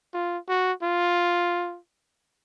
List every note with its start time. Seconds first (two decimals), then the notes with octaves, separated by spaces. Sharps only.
0.14 F4
0.48 F#4
0.83 F4